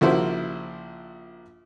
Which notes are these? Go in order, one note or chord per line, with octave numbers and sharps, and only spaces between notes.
A#1 C#3 A#3 E4 F#4 C5